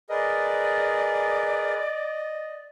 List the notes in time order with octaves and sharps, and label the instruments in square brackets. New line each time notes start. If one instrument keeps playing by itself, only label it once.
[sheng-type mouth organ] G#4 A#4 B4 [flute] D5 [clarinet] D#5